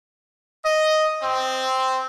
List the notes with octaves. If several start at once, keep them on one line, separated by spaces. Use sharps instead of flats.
D#5
C4